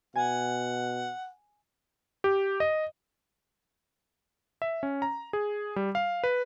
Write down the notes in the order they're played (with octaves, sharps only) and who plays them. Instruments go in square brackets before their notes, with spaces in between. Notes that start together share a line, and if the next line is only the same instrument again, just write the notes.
[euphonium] B2 [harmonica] F#5 [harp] G#5
[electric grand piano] G4
D#5
E5
C#4
A#5
G#4
G3
F5
B4